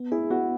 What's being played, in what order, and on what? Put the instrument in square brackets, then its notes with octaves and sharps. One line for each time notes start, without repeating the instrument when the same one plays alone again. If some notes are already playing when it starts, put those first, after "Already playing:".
Already playing: [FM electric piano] B3
[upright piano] E4 [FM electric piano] G#4
[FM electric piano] B3 [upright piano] F#4